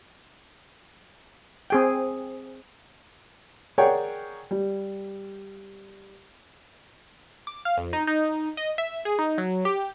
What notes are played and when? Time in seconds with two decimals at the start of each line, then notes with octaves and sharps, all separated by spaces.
1.70 C4 G#4 G5
3.78 G#4 A#4 C#5 D5 F#5 G5
4.51 G3
7.47 D6
7.65 F5
7.77 F2
7.93 D#4
8.07 D#4
8.57 D#5
8.78 E5
9.05 G#4
9.19 D#4
9.38 F#3
9.65 G4